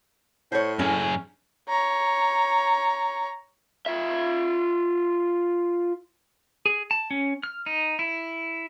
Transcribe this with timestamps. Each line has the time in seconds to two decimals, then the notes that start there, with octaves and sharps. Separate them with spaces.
0.52 A2 C5 C#5
0.79 F#2 C#4 G#4
1.69 C#5 A#5
3.86 F4 E5
6.66 G#4
6.91 A5
7.11 C#4
7.43 F6
7.66 D#4
7.99 E4